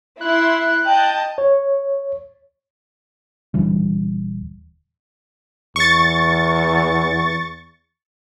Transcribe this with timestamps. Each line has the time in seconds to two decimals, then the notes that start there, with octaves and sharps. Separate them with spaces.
0.21 E4 C6 F#6
0.85 D#5 G5 A5 G6
1.38 C#5
3.54 D#1 D3 E3 G3
5.76 E2 C#6 A6